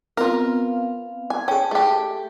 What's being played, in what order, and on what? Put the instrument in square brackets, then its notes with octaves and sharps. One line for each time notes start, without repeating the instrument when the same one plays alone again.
[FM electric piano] B3 C4 F5 [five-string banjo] F4 A#4
[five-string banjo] G#5
[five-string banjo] C#4 G5 [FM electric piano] G#4 A5
[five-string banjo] A3 G4